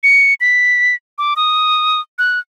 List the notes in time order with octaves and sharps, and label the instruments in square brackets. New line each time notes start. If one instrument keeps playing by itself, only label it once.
[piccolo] C#7
B6
D6
D#6
F#6